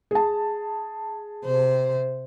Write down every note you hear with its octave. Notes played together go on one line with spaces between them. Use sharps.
G#4 A5
C3 C5